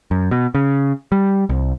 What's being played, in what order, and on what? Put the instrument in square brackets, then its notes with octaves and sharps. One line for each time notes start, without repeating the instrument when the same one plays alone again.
[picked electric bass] F#2
B2
C#3
G3
C2